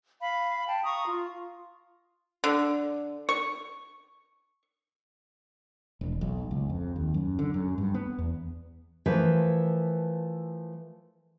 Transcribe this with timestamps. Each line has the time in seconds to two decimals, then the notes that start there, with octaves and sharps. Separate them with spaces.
0.20 F5 B5
0.65 G5 A5
0.83 F5 A#5 C#6 D#6
1.05 F4
2.44 D3
3.29 C#6
6.01 E1
6.21 B1
6.51 C#2
6.70 F2
6.96 D#2
7.14 F#2
7.39 D3
7.54 F#2
7.78 G2
7.94 B3
8.18 E2
9.06 E3 F3 A3 A#4 B4